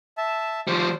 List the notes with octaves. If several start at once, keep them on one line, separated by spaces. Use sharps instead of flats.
E5 A5
F3 G3 C5